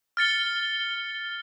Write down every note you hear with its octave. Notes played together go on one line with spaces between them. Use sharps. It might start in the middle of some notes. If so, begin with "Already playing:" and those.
F6 A6 C#7 G7